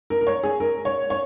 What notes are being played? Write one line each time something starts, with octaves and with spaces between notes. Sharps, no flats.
A#4
A#4
C#5
G#4
A#4
C#5
C#5